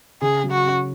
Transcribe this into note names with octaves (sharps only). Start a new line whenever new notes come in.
C#3 G#4
F#3
F#4
C#4